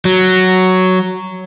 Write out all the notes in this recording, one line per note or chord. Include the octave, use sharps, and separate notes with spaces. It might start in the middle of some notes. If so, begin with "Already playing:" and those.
F#3